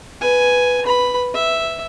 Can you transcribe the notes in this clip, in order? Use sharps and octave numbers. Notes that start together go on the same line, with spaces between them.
B4 G#5
B4 B5
E5